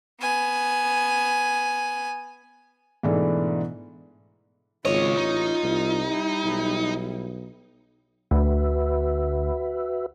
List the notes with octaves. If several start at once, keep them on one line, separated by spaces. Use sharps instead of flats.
B3 G#5
G#2 B2 E3 A3 D4 E4
G#1 C#2 F4 C#5 D#5
A1 D#4
C2
G3 E4
B1
D2 F#4 B4 E5